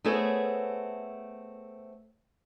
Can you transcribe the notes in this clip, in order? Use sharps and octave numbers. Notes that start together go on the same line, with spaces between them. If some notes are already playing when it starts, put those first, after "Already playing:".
A3 B3 C4 G#4 A4 C#5